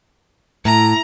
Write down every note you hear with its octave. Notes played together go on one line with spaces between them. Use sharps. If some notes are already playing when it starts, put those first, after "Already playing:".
A2 A#5